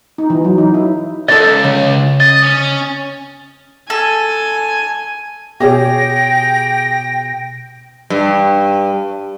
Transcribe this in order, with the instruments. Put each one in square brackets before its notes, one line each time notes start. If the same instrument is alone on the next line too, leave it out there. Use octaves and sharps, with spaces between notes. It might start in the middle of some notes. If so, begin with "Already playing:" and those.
[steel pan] D#4
E3
F#3
D#4
E4
[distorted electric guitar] C#2 [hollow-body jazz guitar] A4 D#5 [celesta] A6
[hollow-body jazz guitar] C#3
[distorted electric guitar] D#5 [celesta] A6
[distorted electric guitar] C#4
[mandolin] A4 [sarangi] G#5
[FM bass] B2 [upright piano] G4 G#4 C#5 [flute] G5 [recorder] A#6
[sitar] G2